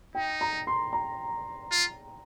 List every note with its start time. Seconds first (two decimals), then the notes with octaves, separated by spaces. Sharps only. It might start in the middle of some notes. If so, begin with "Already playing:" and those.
0.15 D#4 G5
0.41 A#5
0.67 C6
0.93 A#5
1.72 F4